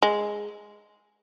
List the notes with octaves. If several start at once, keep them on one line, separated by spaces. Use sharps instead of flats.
G#3